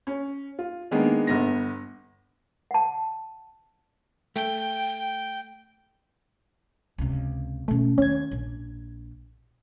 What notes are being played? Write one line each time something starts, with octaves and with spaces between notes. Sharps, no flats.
C#4
F4
D#3 G#3 A#3 B3 D4
G1 B3 A#6
F#5 A5
A3 G5
C#2 C3
B2 A3 C#4
D#2 C#4 G#6
A#1